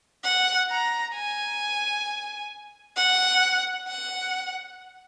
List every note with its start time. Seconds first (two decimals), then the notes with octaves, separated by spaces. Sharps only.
0.24 F#5
0.70 A#5
1.15 G#5
2.97 F#5
3.88 F#5